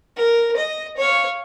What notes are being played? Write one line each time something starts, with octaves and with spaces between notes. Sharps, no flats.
A#4
D#5
C#5 F5